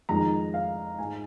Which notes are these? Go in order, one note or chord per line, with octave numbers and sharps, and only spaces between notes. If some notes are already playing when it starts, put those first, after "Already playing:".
F2 D#3 G#3 A#5
F5
G#2 G#3 G#5